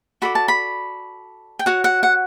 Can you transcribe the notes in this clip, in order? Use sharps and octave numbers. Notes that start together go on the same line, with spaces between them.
F#4 A4 D5 B5
A5
B5
G5
F#4 C#5 F#5
F#5
F#5